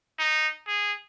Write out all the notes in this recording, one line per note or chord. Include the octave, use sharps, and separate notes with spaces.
D#4
G#4